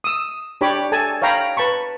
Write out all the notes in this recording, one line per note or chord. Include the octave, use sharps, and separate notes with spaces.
D#6 E6
D4 G4 C#5 D5 B5 D6
A4 G#5 A5
C#5 F5 G5 A#5 B5
B4 A5 B5 C#6